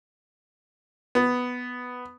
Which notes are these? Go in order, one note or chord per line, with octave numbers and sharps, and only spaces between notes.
B3